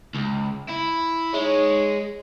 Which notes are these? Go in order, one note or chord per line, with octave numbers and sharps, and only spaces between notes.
C#2
E4
G#3 D#4 C#5